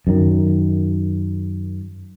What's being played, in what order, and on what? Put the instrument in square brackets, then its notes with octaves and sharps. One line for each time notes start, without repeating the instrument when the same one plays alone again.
[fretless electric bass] F#2 D#3